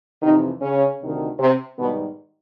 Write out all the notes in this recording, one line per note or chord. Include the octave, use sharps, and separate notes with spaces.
F2 C3 D#3 E3 D#4
C#3 C#4
D2 C3 D#3
C3 C4
G#2 B2 D#3 G3 B3